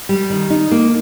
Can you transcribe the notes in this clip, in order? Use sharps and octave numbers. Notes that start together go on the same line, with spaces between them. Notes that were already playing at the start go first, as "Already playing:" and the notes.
G3
D#3
D#4
A#3